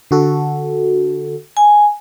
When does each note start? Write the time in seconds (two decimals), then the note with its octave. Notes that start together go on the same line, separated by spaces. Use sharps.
0.11 D3 F#4 A4
1.57 G#5